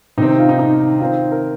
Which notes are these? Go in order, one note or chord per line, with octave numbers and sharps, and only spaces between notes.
C3 D#3 C4 D#4
D#4
F4
D#4
D#4
D#3 C4 F4
A#4